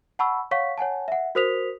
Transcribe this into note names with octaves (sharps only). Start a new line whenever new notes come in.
F#5 A5 B5 C#6 E6
C#5 F5 F#5 C#6 B6
C#5 F#5 G#5 A5
E5 F#5
F#4 A#4 C5 D#6 B6 F7